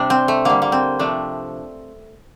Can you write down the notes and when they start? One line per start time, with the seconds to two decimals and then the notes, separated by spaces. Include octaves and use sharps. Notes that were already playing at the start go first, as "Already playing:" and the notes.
Already playing: C3 G3 D4
0.10 C4
0.28 A3
0.45 D3 G3 A#3
0.62 A#3
0.72 C4
0.99 C3 F3 A3 D4